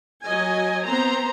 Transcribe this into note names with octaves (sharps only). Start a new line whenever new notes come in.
F#3 D#5 G#5
B3 C4 C5 A#5